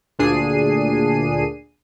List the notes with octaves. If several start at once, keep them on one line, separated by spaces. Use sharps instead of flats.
D2 A#2 D4 G#4 C7 D#7